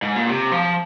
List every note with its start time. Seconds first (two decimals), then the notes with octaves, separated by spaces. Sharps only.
0.02 G#2
0.16 A#2
0.29 C3
0.52 F3